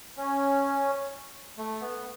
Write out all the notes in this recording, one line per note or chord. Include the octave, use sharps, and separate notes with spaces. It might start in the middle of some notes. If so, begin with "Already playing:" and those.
C#4
A3
B3